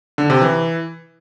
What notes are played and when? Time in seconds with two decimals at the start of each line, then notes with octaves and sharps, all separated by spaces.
0.18 D3
0.30 C3
0.41 E3